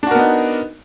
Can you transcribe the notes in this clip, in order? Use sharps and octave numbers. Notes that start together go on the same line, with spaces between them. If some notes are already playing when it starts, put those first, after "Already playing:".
B3 D4 D#4 F#4 A#4